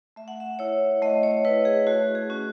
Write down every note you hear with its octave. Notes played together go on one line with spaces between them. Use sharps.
A3 E5
F#5
E5
E4 C#5
A3 D#5
C#5
E4 B4
G#4
A3 F#4
G#4
C#4 F#4